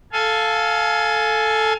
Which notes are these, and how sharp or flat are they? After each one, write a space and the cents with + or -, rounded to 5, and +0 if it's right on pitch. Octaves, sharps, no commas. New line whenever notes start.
A4 +0 F5 +0 G#5 +25